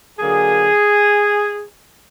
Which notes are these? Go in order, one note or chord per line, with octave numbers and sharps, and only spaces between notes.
D3 F#3 A#3 G#4